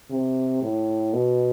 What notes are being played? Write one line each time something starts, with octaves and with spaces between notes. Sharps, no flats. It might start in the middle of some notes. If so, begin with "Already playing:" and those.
C3
A2
B2